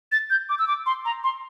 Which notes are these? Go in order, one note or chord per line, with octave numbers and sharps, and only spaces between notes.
A6
G6
D6
E6
D6
C6
A#5
C6